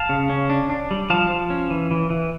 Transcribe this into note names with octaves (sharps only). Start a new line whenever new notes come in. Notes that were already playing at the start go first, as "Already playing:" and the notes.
Already playing: F5 A5
C#3
C#4
D4
D4
G3
F3 F5 A5
F3
C#4
E3
E3
E3